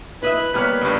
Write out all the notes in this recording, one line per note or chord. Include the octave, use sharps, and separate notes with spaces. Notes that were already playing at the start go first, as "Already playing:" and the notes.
E4 B4 D#5 E5
G3 A#3 B3 B4 C#5 F6 F#6
C#2 G2